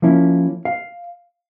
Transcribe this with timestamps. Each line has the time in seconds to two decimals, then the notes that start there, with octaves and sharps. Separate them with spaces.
0.02 F3 A#3 C#4 E4
0.65 F5